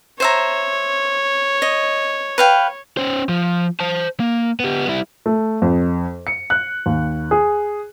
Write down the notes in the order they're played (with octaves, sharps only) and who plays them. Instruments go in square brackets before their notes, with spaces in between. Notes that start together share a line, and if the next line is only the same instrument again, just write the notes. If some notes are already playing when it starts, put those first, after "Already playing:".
[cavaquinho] C5 E5 A#5 [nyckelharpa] C#5
[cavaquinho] D#5
B4 F5 G5
[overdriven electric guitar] C#4 C5
F3
C5 A5
A#3
B3 G4
G3 E4
[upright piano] A3
F2
C#7
F#6
D#2
G#4